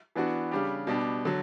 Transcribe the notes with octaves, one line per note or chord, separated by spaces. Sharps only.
E3 B3 D4 F#4
C#3 G3 D4 G4
B2 G3 D4 G4
D3 F#3